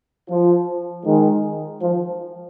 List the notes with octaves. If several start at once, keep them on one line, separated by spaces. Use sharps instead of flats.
F3
D#3 G#3
F3